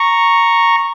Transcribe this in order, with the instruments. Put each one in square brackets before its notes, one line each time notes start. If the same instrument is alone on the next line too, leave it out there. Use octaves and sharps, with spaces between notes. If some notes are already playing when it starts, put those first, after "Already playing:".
Already playing: [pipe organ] A#5 C#6